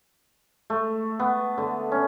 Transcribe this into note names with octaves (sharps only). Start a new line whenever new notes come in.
A3
B3
D3
C#4